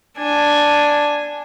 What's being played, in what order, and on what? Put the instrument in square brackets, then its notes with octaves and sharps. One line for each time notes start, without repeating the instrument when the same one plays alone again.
[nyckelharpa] D4 G#5